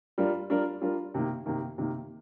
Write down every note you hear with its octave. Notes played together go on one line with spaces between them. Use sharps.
G3 D4 F4 A#4
G3 D4 F4 A#4
G3 D4 F4 A#4
C3 D#3 A#3
C3 D#3 A#3
C3 D#3 A#3